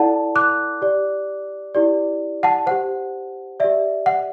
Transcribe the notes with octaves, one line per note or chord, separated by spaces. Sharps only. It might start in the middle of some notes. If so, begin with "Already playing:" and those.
Already playing: E4 A4 D5 F#5 A5
D6 F#6
G4 D5
E4 G4 D5
F#5 A5
G4 C5 F#5
G4 D5 E5
F#5